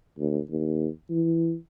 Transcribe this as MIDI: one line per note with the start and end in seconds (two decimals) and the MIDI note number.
0.18 0.39 38
0.50 0.88 39
1.10 1.55 52